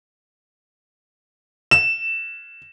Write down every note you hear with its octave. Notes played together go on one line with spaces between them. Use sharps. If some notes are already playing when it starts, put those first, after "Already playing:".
E7